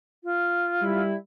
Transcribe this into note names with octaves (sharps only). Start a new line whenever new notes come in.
F4
G3 E4